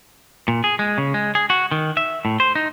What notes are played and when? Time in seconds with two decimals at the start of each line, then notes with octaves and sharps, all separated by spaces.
0.48 A#2
0.64 G#4
0.79 G#3
0.98 C#3
1.14 G#3
1.35 G#4
1.50 F#4
1.72 D#3
1.97 E5
2.25 A2
2.40 C5
2.55 D#4